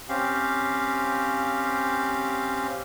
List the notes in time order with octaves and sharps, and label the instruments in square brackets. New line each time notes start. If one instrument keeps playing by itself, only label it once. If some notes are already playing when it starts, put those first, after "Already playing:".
[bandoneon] C4 C#4 G4 F5